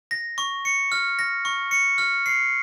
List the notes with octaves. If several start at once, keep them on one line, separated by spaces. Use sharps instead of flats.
A#6
C#6
C#7
F6
A#6
C#6
C#7
F6
C7